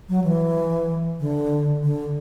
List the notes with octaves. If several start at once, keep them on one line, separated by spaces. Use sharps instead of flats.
F#3
E3
D3
D3